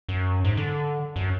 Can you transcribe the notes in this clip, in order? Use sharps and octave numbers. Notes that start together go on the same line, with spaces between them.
F#2
G#2
D3
F#2